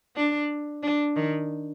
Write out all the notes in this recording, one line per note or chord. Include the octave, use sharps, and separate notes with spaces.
D4
D4
D#3